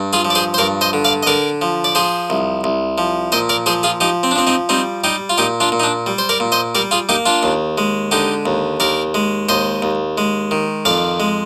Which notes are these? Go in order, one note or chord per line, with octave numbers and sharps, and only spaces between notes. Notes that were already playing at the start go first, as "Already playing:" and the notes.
Already playing: G2
F4 G#4
F3
D5
G#4 C5
C5
G2 A#4 D5
C5 D#5
D3
D5 F5
D#5
D3 A#4 D5
F3
D5
F3 G#4 C5
C2
C2
F3
A#2 C5 D#5
A#4 D5
F3 G#4 C5
F4 G#4
F3 D#4 G4
C4
D4
F3 C4
C4 D#4
G3 C4 D#4
G3 D#4 G4
F4
A#2 D#4 G4
D4 F4
A#2
D#4
D4
G3
C5
A#4 D5
A#2
C5 D#5
G3 A#4 D5
F4 G#4
A#3 D#4 G4
D4 F4
D#2
G#3
D3 D#4 G4
D#2
D#2 A#4 D5
G#3
D#2 C5 D#5
D#2
G#3
D#3
F2 D5 F5
G#3